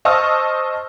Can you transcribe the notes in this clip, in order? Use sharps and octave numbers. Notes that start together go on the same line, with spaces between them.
C5 D#5 A5 C#6 E6 F6